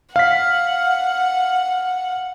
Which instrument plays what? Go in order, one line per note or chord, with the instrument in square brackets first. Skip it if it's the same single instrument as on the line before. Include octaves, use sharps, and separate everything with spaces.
[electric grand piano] F5 F6 B6 [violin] F#5